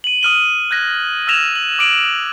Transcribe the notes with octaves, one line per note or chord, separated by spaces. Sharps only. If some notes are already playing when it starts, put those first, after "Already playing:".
D#7 F#7
D#6 F6 D#7 G7
F#6 G#6 A#6
E6 F6 G#6 A#6 E7 F7
F#7
D6 G#6 D7 F#7